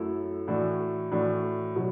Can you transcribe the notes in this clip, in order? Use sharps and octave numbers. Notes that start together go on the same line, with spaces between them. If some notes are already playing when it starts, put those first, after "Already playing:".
Already playing: F#2 F#3 A3 E4 A4
A2 E3 D4 F#4 A4
A2 E3 D4 F#4 A4
B2 F#3